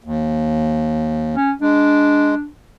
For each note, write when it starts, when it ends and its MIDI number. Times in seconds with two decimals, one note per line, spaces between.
0.04 1.36 39
1.36 1.52 61
1.61 2.35 56
1.61 2.47 62